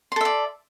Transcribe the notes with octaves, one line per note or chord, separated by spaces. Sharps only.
A4 D5 E5 C6